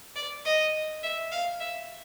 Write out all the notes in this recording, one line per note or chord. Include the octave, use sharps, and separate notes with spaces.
D5
D#5
E5
F5
E5